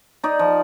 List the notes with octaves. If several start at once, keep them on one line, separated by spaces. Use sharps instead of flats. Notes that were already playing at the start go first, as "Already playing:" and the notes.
D#4 D5
F3